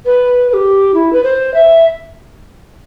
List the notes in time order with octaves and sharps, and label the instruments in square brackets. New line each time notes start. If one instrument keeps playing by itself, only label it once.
[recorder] B4
B4
G4
E4
B4
C5
E5